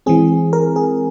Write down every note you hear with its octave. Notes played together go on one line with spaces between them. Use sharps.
E3 G#3 C4 G#4
A#4
G#4